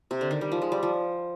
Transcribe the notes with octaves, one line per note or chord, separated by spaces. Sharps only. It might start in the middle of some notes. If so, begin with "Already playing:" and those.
C3
D3
D#3
G3
F3
G#3
G3
F3